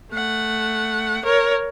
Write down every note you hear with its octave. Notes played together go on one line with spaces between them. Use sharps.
A3 F#5
A#4 C#5